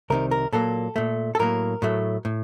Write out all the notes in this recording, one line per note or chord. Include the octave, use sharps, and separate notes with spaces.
C2 C3 D#3 A#4
A#4
A#2 F#3 A#3 A4
A#2 A3
A4
A2 F#3 A#3 A#4
A2 F#3 A3
A2